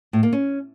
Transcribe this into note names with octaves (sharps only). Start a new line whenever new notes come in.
A2
A#3
C#4